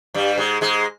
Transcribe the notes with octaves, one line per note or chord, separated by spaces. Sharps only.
G2 G3
G#2 G#3
G#2 G#3